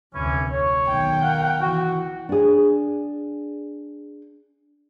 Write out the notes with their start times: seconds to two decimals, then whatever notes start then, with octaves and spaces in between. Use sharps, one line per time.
0.15 F1 D2 E3 C#4
0.52 C#5
0.87 B1 D#3 G5
1.22 A#4 F5 F#5
1.61 E3 F#4
2.29 D4 G#4